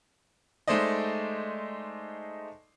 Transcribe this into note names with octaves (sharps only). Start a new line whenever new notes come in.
G#3 A3 D#4 C5 D5 D#5